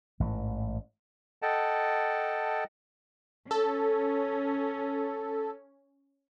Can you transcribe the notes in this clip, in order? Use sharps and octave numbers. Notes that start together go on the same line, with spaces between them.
A1 G#2 E3
A4 D#5 F#5 G5 A5
C#4 A4